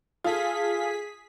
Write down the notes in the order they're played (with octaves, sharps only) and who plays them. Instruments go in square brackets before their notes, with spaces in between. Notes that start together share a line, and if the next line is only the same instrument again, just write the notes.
[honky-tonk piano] F4 A4 [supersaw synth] G#4 B6